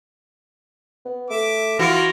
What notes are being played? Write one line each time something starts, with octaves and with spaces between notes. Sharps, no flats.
B3
A3 E5 D6
E3 F4 F#4 A#4
A#5